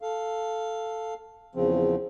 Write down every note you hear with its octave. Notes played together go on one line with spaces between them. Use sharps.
A4 F5
E2 C#3 F3 C4